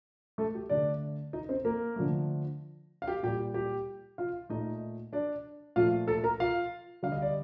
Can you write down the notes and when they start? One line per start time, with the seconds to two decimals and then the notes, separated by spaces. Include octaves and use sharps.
0.38 A3 A4
0.55 G4
0.69 D3 A3 D4 D5
1.33 D#4 D#5
1.49 C4 C5
1.65 A#3 A#4
1.96 D3 F3 A3
3.02 F5
3.08 G4 G5
3.23 A#2 G3 G4 G5
3.54 G4 G5
4.18 F4 F5
4.50 A#2 A3 D#4 D#5
5.13 D4 D5
5.76 A#2 F3 A3 F4 F5
6.08 A4 A5
6.24 A#4 A#5
6.40 F4 F5
7.03 D3 G3 F5
7.12 D#5
7.22 D5